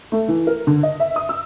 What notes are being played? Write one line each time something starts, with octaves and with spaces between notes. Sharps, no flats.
A3
E3
A#4
D3
D#5
E5
D#6
E6